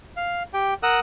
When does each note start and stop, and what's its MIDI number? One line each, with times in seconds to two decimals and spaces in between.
0.17 0.43 77
0.54 0.74 67
0.54 0.74 79
0.83 1.00 70
0.83 1.00 78
0.83 1.00 87
0.83 1.00 88
0.83 1.00 90